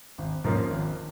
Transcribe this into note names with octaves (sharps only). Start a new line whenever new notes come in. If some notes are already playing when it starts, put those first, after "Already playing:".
G#1
G#2 F3 A#3 C#4
G#1